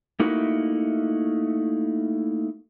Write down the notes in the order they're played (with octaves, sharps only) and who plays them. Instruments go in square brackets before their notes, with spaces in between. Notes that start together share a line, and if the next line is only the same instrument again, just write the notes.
[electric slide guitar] A3 A#3 D#4 E4 F#4 A#4